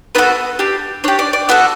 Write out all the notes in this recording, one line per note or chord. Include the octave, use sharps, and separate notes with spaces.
B3 D4 F#4 A4 B4
D4 G4
D4 G4 C#5
D5
D5
B3 F#4 A4